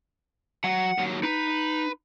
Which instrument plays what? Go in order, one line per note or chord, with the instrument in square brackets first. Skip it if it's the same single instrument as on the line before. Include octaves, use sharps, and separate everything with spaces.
[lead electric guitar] F#3 [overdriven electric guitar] F#5
[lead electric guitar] D#2 F#3
[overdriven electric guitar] D#4 [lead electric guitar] B4